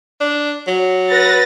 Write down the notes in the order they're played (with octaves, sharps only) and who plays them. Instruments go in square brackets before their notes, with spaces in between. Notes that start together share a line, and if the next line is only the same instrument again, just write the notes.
[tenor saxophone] D4
F#3
[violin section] B4 A6 A#6